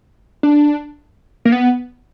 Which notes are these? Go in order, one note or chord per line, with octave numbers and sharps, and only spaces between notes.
D4
A#3
B3